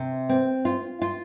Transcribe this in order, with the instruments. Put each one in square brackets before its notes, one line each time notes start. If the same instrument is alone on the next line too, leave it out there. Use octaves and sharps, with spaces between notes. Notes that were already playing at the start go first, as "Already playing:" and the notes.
Already playing: [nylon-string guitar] C3
C4
F4
F4